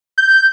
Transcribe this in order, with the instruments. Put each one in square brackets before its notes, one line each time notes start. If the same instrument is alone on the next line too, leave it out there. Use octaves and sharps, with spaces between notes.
[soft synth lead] G6